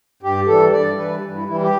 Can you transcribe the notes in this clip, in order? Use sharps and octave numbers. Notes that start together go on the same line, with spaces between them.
G2 G4
E3 G3 A4
G2 D5
E3 G3 B4
G2
E4
E3 G3 E4
G4